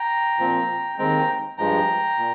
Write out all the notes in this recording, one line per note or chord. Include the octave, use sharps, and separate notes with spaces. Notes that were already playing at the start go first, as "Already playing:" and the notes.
Already playing: G5 A#5
A#2 F3 C4
D#2 D#3 G#3 C4 G5 A#5
G2 F3 G#3 G5 A#5
A#2